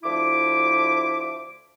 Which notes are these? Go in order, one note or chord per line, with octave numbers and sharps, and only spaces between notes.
D2 F3 E4 E5 D6